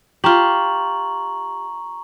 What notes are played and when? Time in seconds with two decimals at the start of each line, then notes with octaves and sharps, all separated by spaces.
0.24 F4 G4 A#5 C#6 F#7